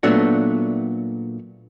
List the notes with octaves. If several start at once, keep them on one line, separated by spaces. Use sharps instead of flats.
A#2 F#3 A3 B3 D4 F#4